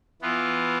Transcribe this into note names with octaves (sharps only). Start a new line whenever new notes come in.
E3 B3 F4